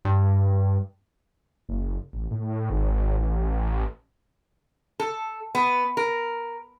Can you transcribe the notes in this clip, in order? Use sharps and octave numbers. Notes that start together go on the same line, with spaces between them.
G2
F#1
A1
A2
G#1
A1
A4
B3
A#4